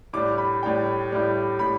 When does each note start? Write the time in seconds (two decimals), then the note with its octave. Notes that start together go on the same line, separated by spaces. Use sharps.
0.13 A2 G3 D4 D6
0.38 B5
0.63 A2 G3 D4 G5
1.11 A2 G3 D4
1.59 A2 G3 B5